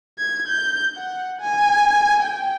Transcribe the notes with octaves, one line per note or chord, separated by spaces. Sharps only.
G#6
G6
F#5
G#5
G5